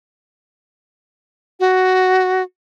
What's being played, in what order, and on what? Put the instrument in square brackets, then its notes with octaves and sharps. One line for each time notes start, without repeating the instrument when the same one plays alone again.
[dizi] F#4